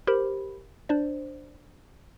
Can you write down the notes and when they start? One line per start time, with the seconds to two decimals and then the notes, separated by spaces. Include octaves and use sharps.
0.07 G4 A#4 C5 B5
0.89 D4 C5 D5